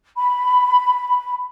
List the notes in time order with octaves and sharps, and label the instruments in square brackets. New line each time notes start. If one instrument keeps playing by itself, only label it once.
[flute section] B5